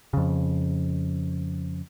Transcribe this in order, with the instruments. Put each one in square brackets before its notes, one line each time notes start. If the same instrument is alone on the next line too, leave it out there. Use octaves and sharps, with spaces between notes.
[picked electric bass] F2 C#3